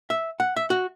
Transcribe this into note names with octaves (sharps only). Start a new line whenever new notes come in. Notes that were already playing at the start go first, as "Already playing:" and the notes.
E5
F#5
E5
F#4